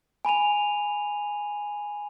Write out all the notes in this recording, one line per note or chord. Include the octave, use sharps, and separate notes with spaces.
G#5 B5 D#7 F7